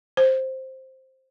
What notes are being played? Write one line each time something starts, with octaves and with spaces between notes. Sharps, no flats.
C5